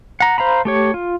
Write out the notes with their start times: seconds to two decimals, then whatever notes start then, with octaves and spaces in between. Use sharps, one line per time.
0.20 F#5 A#5
0.38 C5 F5 A#5 B5
0.65 A3 G4 C#5
0.94 F4